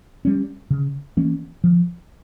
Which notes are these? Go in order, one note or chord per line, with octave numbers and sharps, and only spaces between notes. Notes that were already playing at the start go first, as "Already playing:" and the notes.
G3 C#4
C#3
E3 A#3 C#4
F3